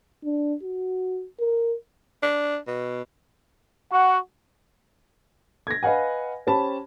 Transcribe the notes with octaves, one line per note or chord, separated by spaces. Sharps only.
D4
F#4
A#4
D4
B2
F#4 F#5
G#6 A#6
B4 D#5 F5 F#5 G#5
C#4 G4 C5 A5 B5